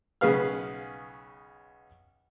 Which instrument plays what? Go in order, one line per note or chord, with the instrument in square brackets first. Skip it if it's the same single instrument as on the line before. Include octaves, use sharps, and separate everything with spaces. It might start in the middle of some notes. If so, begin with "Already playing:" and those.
[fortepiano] B1 C#3 G#4 B4 F5 F6